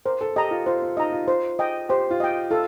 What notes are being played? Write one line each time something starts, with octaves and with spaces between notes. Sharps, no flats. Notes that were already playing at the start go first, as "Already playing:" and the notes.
A#4 C5
A4
G4 D#5 A#5
F4
F4 C5
F4
D#4 D#5 A#5
F4
C5
D#5 G5
G4 C5
F4
D#5 G5
F4 A4